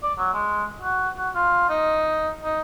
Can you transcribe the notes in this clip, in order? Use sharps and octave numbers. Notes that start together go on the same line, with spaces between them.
D5
F#3
G#3
F#4
F#4
F4
D#4
D#4